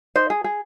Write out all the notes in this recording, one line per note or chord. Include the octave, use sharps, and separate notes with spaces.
D#4 C5
G#4
G#4